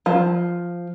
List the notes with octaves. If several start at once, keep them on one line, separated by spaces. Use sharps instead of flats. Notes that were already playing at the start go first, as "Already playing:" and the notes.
F3